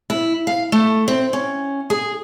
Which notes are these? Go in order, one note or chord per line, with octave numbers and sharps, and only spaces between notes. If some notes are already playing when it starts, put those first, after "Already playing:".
E4
F5
A3
C4
C#4
G#4